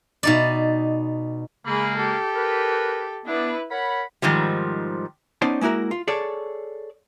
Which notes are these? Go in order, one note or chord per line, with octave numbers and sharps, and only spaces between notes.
B2 D#4 D5
C#3 G#3 A#3 G#4 B5
G4 A4
A#4 B4
B3 D4 E4 B4
A#4 C#5 F#5 B5
G#2 D#3 F3 G3
B3 C#4 D#4 C5 D5 A5
G#3 A#3 E4 F#4 A#4
F4
G#4 A4 C#5 D5